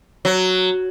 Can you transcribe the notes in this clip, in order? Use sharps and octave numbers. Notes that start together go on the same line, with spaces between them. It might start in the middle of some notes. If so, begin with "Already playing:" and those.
F#3